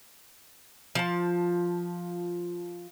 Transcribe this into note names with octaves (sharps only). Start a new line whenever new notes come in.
F3 A5